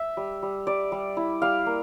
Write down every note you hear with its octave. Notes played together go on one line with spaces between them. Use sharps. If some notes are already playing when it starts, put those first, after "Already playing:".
Already playing: E5
G3
G3
G3 D5
G3
E4
G3 F5
A#3